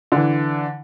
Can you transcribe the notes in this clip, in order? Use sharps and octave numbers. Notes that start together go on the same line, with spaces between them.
D3 E3